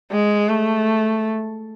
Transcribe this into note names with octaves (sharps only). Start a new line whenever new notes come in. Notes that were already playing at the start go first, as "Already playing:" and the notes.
G#3
A3